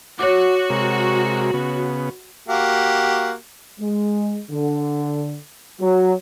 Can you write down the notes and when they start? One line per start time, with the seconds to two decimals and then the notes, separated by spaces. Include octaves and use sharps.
0.19 F#4 C#5 D6
0.70 C3 G#3 A#4
1.54 C#3 B3
2.48 A#3 F#4 G4
3.79 G#3
4.51 D3
5.80 F#3